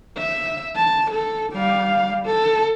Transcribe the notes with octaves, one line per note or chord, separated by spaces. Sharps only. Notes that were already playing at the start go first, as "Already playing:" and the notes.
E5
A5
A4
G3 F5
A4